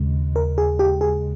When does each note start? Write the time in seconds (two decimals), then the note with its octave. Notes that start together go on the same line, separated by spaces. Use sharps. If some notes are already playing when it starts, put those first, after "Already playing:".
Already playing: D#2 C#3 G#3
0.36 A#4
0.58 G#4
0.79 G4
1.01 G#4